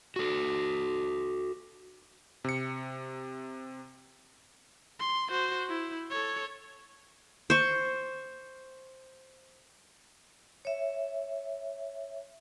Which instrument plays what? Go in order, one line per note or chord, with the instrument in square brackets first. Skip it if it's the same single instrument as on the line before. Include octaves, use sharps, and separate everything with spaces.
[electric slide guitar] F#4 A4
[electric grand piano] C3 C#7
[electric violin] C6
F#4 C5
E4
A4 C#5
[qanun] C5 C#6
[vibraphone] C#5 E5